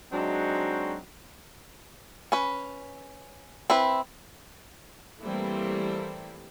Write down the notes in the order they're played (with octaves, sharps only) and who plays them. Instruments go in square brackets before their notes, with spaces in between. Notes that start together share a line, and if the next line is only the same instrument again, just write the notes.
[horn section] F#3 G#3 C4 D4 D#4 F#4
[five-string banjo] C#4 B4
C4 E4 B4
[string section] E3 G3 A3 A#3 C4 E4